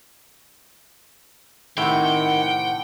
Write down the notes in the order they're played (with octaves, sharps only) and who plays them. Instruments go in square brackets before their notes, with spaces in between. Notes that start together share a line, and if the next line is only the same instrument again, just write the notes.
[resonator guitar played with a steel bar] A2 C3 [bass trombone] D#3 [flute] F#5 [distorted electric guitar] G5